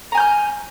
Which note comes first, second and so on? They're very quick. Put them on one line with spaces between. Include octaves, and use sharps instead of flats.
A#5 G#5 G6 F6